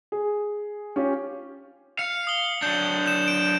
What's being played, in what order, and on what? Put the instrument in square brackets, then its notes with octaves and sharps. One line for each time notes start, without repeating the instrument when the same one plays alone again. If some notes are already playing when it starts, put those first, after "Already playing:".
[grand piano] G#4
C#4 F4 G4 C#5
[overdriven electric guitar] F5 [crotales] C#7
[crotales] D#6 G7
[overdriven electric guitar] F#3 D4 [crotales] G6
[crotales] G6 E7
D7